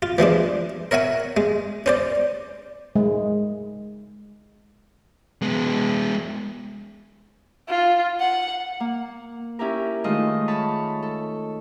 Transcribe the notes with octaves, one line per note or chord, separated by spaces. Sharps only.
F4
E3 F3 G#3 D4
A#4 C#5 E5 F#5 G#5
G#3
C#4 C5 D5
G#3
G#3 B3
F4
F#5
A#3
C#4 E4 G4 A#4
D#3 G#3 A3 F4 D#5
C#5 A5 B5
A4